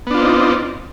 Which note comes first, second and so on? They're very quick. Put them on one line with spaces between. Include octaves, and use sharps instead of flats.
B3 D4 F4 C4 D#4